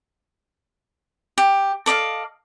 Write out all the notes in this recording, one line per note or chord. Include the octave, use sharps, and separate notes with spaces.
G4
A4 D5 D#5 F5